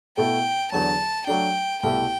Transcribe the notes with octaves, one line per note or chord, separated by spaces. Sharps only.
B2 A3 E4 A4 G5
E2 D3 F#3 A5
F#3 A3 D4 G5
C2 B2 A3 E4 G4 G5